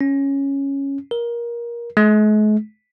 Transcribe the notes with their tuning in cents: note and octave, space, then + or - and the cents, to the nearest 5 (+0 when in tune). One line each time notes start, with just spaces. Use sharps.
C#4 -5
A#4 +20
G#3 +45